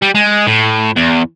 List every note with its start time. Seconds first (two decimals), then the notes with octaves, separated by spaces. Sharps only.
0.02 G3
0.15 G#3
0.47 A2
0.96 E2